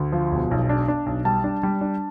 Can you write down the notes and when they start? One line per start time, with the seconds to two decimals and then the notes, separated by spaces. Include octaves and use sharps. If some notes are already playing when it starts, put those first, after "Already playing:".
Already playing: D2
0.12 F3
0.32 E1
0.51 B1
0.69 D4
0.88 D4
1.06 B1
1.25 G3 A5
1.44 D4
1.63 G3
1.81 D4